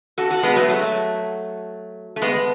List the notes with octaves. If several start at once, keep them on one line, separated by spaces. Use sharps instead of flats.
F#4 A4
F#4 A4
G#3 B3
F#3 A3
F#3 A3
A3
G#3 B3